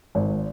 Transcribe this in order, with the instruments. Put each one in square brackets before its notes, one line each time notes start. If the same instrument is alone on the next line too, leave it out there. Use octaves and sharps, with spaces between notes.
[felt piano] G#1